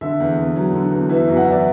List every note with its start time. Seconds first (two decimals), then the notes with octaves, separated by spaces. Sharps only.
0.01 D3 E5
0.20 E2
0.37 E2
0.56 F#3
0.73 D3
0.91 E2
1.09 E3 E5
1.28 F#2
1.37 F#5
1.44 E3 E5
1.51 D5